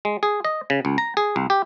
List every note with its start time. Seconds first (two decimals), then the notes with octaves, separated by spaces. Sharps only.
0.05 G#3
0.23 G#4
0.45 D#5
0.70 C#3
0.85 C#2
0.98 A#5
1.17 G#4
1.36 C2
1.50 G4